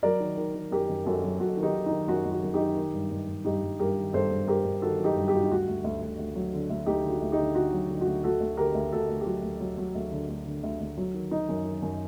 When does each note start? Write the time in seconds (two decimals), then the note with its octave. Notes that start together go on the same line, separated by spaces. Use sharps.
0.03 F#3 A#4 D5
0.20 D#3
0.37 D#3
0.54 D#3
0.71 F#2 G4 A#4
0.89 F#2
1.06 F#2 F#4 A4
1.24 F#3
1.40 F#2 F#4 A4
1.57 D#3
1.63 D#4 G4
1.74 D#3
1.86 D#3 D#4
2.08 F#2 F#4
2.26 F#2
2.32 F#4
2.43 F#2
2.54 D#4 G4
2.60 D#3
2.76 D#3
2.94 G2
3.11 G2
3.28 G2
3.45 G2 D#4 G4
3.63 G2
3.79 G2 G4 A#4
3.96 D#3
4.13 G2 A4 C5
4.31 G2
4.47 G2 G4 A#4
4.65 G2
4.81 D#3 F#4 A4
4.99 F#3
5.04 D#4 G4
5.16 G2
5.28 G4
5.34 G2 F#4
5.43 D#4
5.50 D2 F#4
5.68 D2
5.84 D2
6.02 D2
6.18 D2
6.36 F#3
6.53 D3
6.70 D2
6.86 D2 D#4 G4
7.03 D3
7.10 F#4
7.21 D2
7.32 D#4 G4
7.38 D3
7.55 D3 F#4
7.73 F#3
7.90 D3
8.01 F#4
8.06 D2
8.24 D2 F#4 A4
8.40 D2
8.57 D3 G4 A#4
8.75 D2
8.92 D2 F#4 A4
9.09 D2
9.21 G4
9.26 F#3 F#4
9.43 D2
9.61 F#3
9.78 F#3
9.95 D2
10.11 D3
10.29 D2
10.46 D3
10.63 D2
10.80 D2
10.98 F#3
11.14 D#3
11.31 F#3 D#4
11.49 F#2
11.65 D#3
11.82 F#2